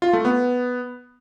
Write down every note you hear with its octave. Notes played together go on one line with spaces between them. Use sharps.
F4
A3
B3